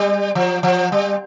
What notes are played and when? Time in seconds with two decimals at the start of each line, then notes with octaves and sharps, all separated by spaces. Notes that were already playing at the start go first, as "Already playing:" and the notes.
Already playing: G3
0.35 F3
0.63 F3
0.92 G3